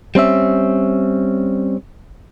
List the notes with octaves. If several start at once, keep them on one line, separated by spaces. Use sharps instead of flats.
G3 C4 C#4 E5